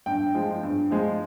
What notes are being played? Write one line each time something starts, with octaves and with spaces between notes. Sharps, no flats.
G2 G5
F3 G#3
G2
F3 G#3